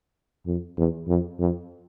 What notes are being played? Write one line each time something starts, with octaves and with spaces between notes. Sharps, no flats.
F2
E2
F2
F2